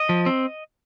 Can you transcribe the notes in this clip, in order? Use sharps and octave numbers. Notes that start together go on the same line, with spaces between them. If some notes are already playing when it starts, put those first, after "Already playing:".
Already playing: D#5
F3
C4